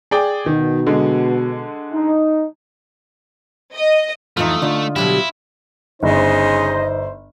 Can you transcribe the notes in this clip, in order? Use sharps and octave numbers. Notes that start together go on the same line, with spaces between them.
G#4 D5 G5
B2 D#3
D3 G#3
D#4
D#5
F2 E3 A3 D#4 F4 D#6
D3 D#4 F4
B2 F#3 E4 G4
G1 C#3 D#4 C5 D#5